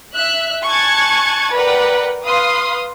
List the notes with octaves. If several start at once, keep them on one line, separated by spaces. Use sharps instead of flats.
E5 F#6
G#5 A5 C#6 F#6 G#6 A6
A#4 B4 D5 F#5 G5
B4 F5 C6 D#6